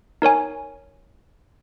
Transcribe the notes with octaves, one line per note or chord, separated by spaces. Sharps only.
D#4 A#4 C#5 G#5